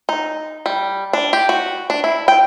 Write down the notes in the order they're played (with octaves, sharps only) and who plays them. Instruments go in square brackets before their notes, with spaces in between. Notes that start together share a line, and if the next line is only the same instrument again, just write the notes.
[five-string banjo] D#4
G3
D4
G4
F#4
D4
E4
G5